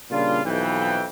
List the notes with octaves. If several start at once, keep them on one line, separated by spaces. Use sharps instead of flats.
A#2 C#3 G3 D4 F4
B1 F2 E3 G5